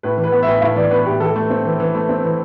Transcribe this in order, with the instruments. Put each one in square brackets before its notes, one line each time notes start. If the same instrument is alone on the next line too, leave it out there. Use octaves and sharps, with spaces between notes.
[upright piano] A2 B4
E3
B4
B3
A2 E5
A2 F5
E3 D5
B3 B4
A2 G4
E3 A4
A3
C4
E3
E3
A3
C4
E3